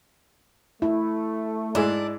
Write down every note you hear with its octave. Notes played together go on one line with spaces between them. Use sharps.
A3 E4
G#2 D4 E4 G#4